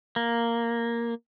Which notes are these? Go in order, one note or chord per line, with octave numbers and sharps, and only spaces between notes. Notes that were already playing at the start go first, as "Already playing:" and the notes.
A#3